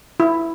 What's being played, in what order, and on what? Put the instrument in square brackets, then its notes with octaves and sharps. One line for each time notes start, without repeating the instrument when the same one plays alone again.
[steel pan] E4